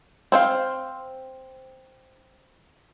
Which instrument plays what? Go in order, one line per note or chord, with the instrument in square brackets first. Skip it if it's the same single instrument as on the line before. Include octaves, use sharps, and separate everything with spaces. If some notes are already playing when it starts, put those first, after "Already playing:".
[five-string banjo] C4 C5 F5